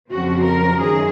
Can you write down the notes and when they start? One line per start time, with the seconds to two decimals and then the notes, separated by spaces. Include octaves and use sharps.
0.11 F2 C#3 F3 C4 F#4
0.45 A#4
0.79 F#2 D#3 G#4